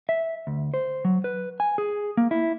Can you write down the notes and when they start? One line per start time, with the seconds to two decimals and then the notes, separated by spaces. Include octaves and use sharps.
0.09 E5
0.47 D2
0.74 C5
1.05 F#3
1.24 B4
1.60 G#5
1.78 G#4
2.17 A#3
2.31 E4